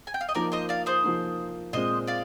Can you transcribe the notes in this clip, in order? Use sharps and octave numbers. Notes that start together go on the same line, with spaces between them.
G#5
G5
F5
D#5
F3 A#3 D#4 A#4 D5
C5 D#5
D5 F5
G#4 C5
F3 A#3 D#4
A#2 G#3 C4 C5 D#5
D5 F5